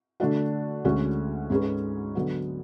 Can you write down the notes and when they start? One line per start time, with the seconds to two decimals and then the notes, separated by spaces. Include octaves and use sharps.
0.20 D3 A3 D4 F#4
0.85 D2 D3 G#3 C#4 F#4
1.50 G#2 G#3 C#4 G#4 B4
2.15 D3 F#3 B3